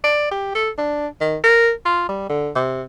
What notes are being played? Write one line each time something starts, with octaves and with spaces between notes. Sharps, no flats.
D5
G4
A4
D4
D#3
A#4
F4
G3
D3
C3